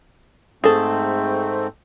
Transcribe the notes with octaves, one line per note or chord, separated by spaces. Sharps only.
G#2 A3 C4 G#4 A4